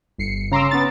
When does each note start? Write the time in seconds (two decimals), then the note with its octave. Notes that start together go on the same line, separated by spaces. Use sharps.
0.18 G1 C7 C#7
0.51 C#3 A#5 C6 D6 E6
0.71 B3 C#4 A6